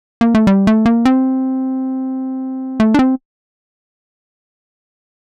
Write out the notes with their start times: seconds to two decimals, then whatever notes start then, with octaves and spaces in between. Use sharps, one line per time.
0.21 A#3
0.35 A3
0.47 G3
0.67 A3
0.86 A#3
1.05 C4
2.80 A3
2.94 D4
2.99 C4